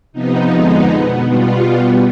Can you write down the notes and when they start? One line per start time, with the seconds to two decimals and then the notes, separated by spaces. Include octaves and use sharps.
0.13 C3 F3 B3 D#4
0.50 F2 D3 G#3 B3
0.88 B2 B3
1.25 B2 G3 B3 F4
1.62 B2 G3 B3